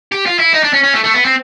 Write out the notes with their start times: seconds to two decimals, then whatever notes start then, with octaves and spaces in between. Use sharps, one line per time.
0.12 G4
0.26 F4
0.39 E4
0.53 D#4
0.63 D4
0.73 C#4
0.83 C#4
0.94 A3
1.04 A3
1.14 B3
1.25 C4